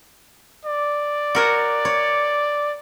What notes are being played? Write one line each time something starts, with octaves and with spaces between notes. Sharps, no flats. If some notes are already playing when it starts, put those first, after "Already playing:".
D5
F#4 A#4 C#5
C#5